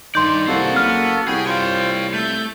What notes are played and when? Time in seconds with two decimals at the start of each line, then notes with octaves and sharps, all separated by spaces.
0.15 G2 D#3 D5 C6 G6
0.47 C2 A#3 F#4 A4 C5 F#5
0.76 F#1 B3 F6
1.28 C2 F#4 G#4 G5 B5
1.47 F4 C5 C#5 G5
2.14 A3 G6